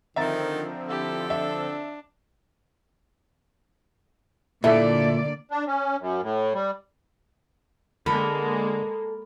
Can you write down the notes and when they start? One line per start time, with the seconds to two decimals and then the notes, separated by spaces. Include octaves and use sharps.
0.16 D3 D#3 F3 C4 E5 A#5 A6
0.89 E4 G4 A4
1.30 D4 E5
4.64 A#2 D3 A#3 E4 A4 D5 E5
5.51 D4
5.67 C#4
6.00 F#2
6.23 A2
6.54 G3
8.06 D3 G#3 A#3 A4 A#4 B5